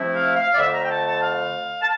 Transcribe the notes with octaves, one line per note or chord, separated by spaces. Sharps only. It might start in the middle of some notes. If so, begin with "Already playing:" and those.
Already playing: C3 F3 A3 C4 E4
F5
F5
D5
F2 D3 A3 E5
A#5
G5
A5
A5
F5
A5